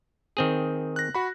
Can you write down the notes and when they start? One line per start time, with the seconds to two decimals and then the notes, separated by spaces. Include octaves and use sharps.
0.37 D#3 C4 G#4
0.96 F#6 A#6
1.15 F#4 B5